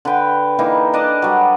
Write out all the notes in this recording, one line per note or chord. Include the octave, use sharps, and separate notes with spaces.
D3 B4 G5
E3 A#3 D#4
D4 D5 D#5 A5
F#3 G3